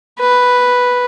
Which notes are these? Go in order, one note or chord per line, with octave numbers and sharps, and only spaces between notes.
B4